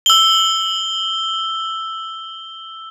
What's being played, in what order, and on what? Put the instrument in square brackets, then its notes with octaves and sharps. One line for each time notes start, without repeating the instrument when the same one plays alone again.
[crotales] E6 G7